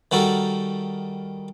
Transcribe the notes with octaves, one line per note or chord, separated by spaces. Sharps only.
D#3 G3 F#4 A4 A#4